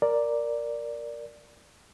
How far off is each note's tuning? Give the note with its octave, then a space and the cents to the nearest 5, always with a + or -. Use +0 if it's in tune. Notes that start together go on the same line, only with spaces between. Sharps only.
A#4 +0 D5 +0